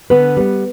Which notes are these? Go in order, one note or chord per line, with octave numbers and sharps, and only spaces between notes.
D3 B3 B4
G3 B3